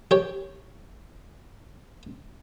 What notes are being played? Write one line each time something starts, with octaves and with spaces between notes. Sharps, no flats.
G4 C#5